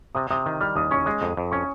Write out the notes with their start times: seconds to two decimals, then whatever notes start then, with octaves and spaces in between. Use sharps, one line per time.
0.15 C3 D#6
0.31 C3 D#6
0.46 D#3
0.61 G3 F6
0.76 D#2 D#6
0.91 C#4 C#6
1.06 G#3 D#6
1.22 F2
1.37 F2
1.52 C#4 C#6